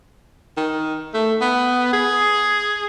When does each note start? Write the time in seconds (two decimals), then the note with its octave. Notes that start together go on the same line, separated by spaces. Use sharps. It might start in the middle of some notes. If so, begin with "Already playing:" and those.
0.57 D#3
1.14 A3
1.41 B3
1.93 G#4